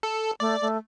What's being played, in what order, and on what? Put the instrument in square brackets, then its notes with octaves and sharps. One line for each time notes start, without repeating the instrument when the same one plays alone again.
[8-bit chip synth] A4
[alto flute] A3 [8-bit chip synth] D5
[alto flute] A3